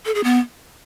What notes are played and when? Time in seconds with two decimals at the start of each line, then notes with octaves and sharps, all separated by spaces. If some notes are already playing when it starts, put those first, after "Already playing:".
0.05 A4
0.15 G#4
0.24 B3